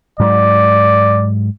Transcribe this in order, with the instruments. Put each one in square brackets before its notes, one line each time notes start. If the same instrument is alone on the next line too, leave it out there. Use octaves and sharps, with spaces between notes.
[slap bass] G#2 F#3 [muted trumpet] D5